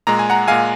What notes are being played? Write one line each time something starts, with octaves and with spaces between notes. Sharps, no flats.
A#2 G#3 A#5
G#5
F#5 A#5
A#2 G#3 F5 G#5